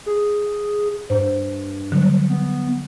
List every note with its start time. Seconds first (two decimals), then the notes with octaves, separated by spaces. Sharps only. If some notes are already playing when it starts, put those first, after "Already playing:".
0.06 G#4
1.10 G2 C5
1.92 D3 F#3 G3
2.29 B3